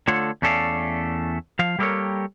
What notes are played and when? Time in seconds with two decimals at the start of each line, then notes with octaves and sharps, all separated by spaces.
0.07 D3 A3 F4 A4 C#5 F#5
0.42 E2 A3 C#4 A4 D5 F5
1.59 F3 F5
1.79 G3 A#3 G4 A4 A#4 C#5